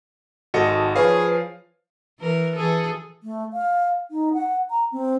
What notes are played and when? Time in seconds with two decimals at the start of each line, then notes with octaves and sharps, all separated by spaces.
0.54 G#1 F#4 A4 D#5 C#7
0.96 F3 G#4 B4 C#5 F5
2.20 E3 A#4
2.56 E3 G#4 A4
3.23 A3
3.53 F5
4.11 D#4
4.33 F#5
4.70 A#5
4.92 C4